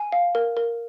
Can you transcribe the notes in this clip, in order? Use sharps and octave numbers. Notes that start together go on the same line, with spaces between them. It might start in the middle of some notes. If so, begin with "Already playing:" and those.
Already playing: G#5
F5
A#4
A#4